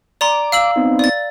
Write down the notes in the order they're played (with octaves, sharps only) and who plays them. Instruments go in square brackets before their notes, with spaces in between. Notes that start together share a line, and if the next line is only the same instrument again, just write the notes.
[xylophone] D5 A#5 C6 [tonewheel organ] D6
[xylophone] F5 E6 F#7
[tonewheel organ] B3 C4 D#4
[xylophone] D5 A6